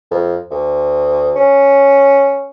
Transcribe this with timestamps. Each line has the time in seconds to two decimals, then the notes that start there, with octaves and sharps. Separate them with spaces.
0.11 F2
0.51 D2
1.36 C#4